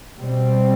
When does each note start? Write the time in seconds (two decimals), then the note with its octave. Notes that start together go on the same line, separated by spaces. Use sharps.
0.18 B2 G3 C4